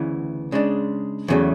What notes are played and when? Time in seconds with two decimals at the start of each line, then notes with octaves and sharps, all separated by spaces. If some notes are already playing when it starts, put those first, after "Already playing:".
Already playing: D2 C#3 E3 B3
0.52 C#3 G#3 D4
1.28 E2 C#3 F#3 A3